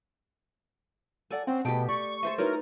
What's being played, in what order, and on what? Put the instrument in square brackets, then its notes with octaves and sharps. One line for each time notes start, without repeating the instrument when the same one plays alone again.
[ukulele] A4 D5 F#5 [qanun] G#5
[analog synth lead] C4 [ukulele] C#4 F#5
[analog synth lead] B2 [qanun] A3 G4 [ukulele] G#4 G5 A5
[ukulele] D5 [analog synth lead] C#6
[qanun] A4 C5 D#5 [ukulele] E5
[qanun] D#4 B4 [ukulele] E4 F#4 C#5 [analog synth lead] A#4